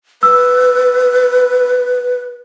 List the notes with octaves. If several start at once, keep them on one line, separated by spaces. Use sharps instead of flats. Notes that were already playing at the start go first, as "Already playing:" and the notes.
B4 E6